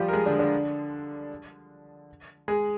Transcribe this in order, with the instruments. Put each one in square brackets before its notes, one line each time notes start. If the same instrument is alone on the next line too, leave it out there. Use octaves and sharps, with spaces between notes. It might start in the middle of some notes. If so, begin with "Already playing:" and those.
Already playing: [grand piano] F3 G3 F4 G4
A#4
G#3 G#4
D3 D4
D3 D4
G#3 G#4